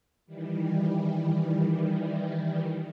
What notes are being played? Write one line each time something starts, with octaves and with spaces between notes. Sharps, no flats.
D#3 E3 G3